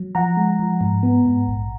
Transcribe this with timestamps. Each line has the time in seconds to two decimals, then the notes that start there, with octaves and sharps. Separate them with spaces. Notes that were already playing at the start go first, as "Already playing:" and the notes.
Already playing: F#3
0.15 F3 F#5 A#5
0.37 G#3
0.59 F3
0.81 G#2
1.03 B3
1.25 G#2
1.47 A#1